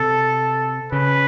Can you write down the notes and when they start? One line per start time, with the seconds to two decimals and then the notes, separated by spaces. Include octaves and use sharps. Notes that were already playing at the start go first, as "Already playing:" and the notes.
Already playing: C3 A4
0.92 C#3 B4